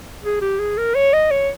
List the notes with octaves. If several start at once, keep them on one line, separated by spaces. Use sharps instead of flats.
G#4
G4
G#4
A#4
C#5
D#5
C#5